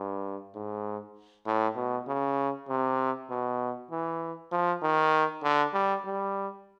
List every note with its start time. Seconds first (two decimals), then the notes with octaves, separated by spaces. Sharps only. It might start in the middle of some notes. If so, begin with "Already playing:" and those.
Already playing: G2
0.55 G#2
1.46 A2
1.76 B2
2.08 C#3
2.69 C3
3.30 B2
3.91 E3
4.52 F3
4.82 D#3
5.43 D3
5.74 G3
6.05 G3